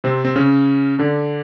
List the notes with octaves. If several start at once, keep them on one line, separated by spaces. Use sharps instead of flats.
C3 C4
C4
C#3 C#4
D3 D4